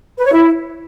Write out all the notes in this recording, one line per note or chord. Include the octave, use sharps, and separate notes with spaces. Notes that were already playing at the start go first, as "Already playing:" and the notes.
B4
C#5
E4